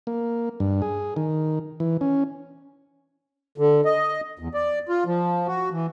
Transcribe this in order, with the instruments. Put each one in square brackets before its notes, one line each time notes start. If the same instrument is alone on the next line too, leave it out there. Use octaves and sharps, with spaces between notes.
[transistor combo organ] A#3
G2
G#4
D#3
E3
C#4
[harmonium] D3
D#5
E2
D5
F4
F3
F#4
E3